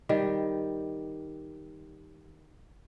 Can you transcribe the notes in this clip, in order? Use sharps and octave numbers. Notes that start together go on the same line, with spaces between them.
D#3 G3